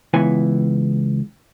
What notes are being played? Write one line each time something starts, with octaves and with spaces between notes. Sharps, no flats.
C#2 E3 B3 G#5